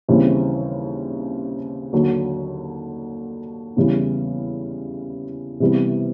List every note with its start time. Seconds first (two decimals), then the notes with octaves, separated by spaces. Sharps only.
0.08 D#2 C#3 E3 G3 C4
1.93 D#2 D3 F#3
3.76 E2 C#3 E3 G3
5.60 C3 E3 G3 B3